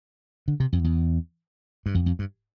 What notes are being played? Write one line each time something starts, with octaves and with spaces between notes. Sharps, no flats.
D3
C3
F2
E2
G2
F2
F2
G2